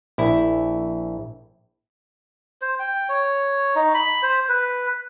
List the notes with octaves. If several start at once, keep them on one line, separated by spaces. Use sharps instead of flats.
A#1 E4
C5
G5
C#5
D#4
B5
C5
B4